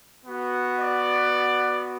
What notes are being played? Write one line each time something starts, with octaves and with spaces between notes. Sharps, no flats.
B3 F#4
D5